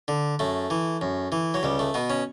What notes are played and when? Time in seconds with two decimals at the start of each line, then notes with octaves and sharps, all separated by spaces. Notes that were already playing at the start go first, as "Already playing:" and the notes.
0.08 D3
0.39 F#2 A3
0.70 E3
1.01 F#2
1.32 E3
1.54 F#3
1.63 C#2 G3
1.79 A3
1.94 B2 B3
2.10 C#4